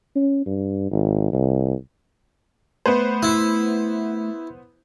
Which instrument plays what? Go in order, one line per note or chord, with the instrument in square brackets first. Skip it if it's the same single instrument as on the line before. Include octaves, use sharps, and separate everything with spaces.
[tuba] C#4
G2
G#1
C2
[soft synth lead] A3 [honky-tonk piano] B3 B4 C5
[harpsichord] E4